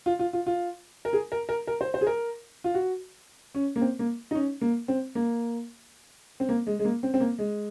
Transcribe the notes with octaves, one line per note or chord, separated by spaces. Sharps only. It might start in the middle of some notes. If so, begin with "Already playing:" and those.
F4
F4
F4
F4
A#4
G#4
A#4
A#4
A#4
C5
C5
G#4
A#4
F4
F#4
C#4
A#3
C4
A#3
D#4
C#4
A#3
C4
A#3
C4
A#3
G#3
G#3
A#3
C4
C4
A#3
G#3